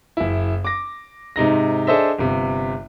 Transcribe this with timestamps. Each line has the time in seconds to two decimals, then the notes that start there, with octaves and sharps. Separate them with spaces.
0.17 F#1 E4
0.65 D6 A#6
1.36 G#2 C3 D#4 A#6
1.87 D4 G#4 A4 C5 D#5 E5
2.18 G1 C3